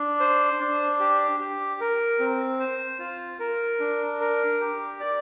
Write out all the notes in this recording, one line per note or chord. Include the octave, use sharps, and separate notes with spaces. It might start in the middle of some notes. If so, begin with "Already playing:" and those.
Already playing: D4
C5
D4
G4
G4
A#4
C4
C5
F4
A#4
D4
A#4
G4
D5